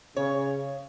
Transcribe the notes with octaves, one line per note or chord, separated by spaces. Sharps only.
C#3 C#5